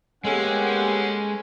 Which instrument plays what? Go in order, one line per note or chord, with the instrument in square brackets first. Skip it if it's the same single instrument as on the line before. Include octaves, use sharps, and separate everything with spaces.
[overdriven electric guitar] G#3 [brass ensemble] A#3 G4 F#5 [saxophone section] B3 A4 [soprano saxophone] C#4